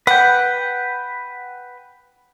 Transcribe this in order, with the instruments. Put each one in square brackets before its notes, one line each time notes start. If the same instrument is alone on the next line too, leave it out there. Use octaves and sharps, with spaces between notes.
[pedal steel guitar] B4 G5 [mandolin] F#5